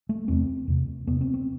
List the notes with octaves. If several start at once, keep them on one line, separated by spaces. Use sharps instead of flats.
A3
E2 C3 C4
E2 C3
E2 C3 B3
C4
C4